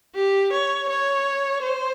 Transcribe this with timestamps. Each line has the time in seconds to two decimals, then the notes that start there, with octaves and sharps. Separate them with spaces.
0.15 G4
0.52 C#5
0.89 C#5
1.63 C5